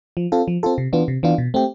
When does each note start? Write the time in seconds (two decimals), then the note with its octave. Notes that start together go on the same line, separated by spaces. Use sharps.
0.17 F3
0.32 C4 F4 A4
0.48 F3
0.63 C4 F4 A4
0.78 C3
0.93 E3 B3 D4 F4
1.08 C3
1.23 E3 B3 D4 F4
1.38 B2
1.54 A3 C4 G4